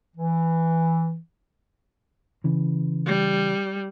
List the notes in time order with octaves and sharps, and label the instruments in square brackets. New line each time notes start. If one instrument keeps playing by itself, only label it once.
[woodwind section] E3
[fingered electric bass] C#3 E3
[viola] G3